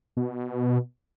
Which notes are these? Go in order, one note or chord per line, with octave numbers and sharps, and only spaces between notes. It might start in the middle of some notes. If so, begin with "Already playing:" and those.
B2